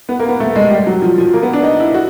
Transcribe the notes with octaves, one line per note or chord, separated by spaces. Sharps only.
B3
A#3
B3
A3
G#3
G3
F#3
F3
F3
A#3
B3
D4
D#4
E4
F#4